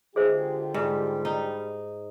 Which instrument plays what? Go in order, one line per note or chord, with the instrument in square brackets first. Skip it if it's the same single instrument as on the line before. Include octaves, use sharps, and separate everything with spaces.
[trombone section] D3 F4 G4 [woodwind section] G#3 [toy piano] G#4 C5 E5
[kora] G#2 [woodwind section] G3
[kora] D#4